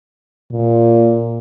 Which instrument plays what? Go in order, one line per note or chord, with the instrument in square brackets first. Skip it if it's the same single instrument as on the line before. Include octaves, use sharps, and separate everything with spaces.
[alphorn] A#2